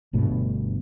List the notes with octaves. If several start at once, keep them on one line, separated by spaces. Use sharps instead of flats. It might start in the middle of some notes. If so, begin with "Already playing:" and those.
G1 G2 B2 A3